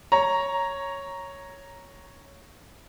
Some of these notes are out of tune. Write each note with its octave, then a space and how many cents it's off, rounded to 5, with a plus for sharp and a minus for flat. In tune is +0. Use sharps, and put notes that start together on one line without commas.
C#5 +0 A#5 +0